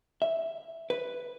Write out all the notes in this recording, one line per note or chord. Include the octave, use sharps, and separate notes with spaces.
E5
B4